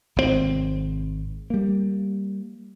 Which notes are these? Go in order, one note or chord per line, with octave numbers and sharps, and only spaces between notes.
G#1 C3 D#3 C4
G3 A#3